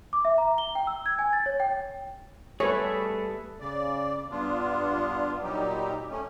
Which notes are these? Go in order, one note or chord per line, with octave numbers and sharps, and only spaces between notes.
D6
E5
A#5
G7
G5
E6
G#6
G#5
A6
C#5
G5
G3 A3 G#4 A4 B4 C#5
C#3 D5
G2 B3 D4 F4
A#2 F#3 G3 D#4 G4
A3 C#4